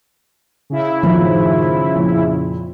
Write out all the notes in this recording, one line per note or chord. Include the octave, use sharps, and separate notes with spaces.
C#3 E4
F#2 A2 D#3 F3
F2 A#2